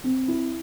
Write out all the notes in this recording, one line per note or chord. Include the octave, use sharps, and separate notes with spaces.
C4
E4